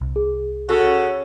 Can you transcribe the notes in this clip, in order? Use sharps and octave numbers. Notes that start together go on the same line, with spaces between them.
C2
G#4
C#3 F#4 A4